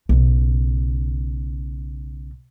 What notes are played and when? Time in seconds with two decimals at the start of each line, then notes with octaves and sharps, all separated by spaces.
0.09 B1 C#3